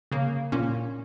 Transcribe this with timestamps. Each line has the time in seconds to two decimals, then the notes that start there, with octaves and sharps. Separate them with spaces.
0.12 C#3 A#3
0.52 A#2 A#3 C#4